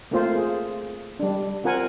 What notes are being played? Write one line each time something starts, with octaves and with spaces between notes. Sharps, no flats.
A3 A#3 C4 F4 C5
G#4
G3 D4
C4 F4 A#4 F#5 G#5